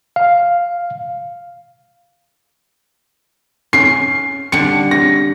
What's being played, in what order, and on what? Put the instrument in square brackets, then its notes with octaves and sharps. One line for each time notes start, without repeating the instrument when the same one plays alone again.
[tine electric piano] F5
[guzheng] C#4 [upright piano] C7
[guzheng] D3 G3 [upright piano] C#7
[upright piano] A#6